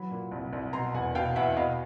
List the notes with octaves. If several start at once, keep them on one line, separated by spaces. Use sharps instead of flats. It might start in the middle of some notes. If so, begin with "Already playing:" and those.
Already playing: E3 F#3 B5
A#2
C2
C2
B2 A#5 C6
E2 F#5 G#5
B2 F5 G5
E2 E5 F#5
B2 D#5 F5